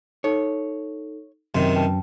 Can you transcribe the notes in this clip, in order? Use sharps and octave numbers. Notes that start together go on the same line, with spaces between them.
D#4 A4 C#5
F#2 C3 D#3 C6
B4 G5 A5